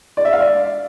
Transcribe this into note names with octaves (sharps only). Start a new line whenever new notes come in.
D5
E5
F5
D5